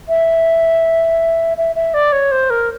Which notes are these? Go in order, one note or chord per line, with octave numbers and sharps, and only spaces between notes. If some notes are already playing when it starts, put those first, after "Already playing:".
E5
E5
E5
D5
C#5
C5
A#4